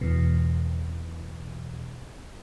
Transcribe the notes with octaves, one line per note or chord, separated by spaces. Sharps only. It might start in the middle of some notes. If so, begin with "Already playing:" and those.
E2 B2